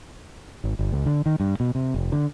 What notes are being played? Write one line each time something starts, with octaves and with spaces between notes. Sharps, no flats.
G#1
G1
C#2
D3
D#3
G2
B2
C3
F1
D3